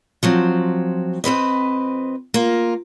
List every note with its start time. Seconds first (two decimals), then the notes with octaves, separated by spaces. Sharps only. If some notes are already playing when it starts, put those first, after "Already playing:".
0.23 F3 F#3 C4
1.24 F2 C4 B4 D#5
2.34 A#3 F4